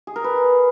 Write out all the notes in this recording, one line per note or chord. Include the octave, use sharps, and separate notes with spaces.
G#4
A#4
B4